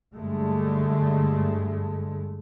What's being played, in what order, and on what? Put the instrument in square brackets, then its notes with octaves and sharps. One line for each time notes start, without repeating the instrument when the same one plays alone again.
[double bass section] G2 D3 G#3 A3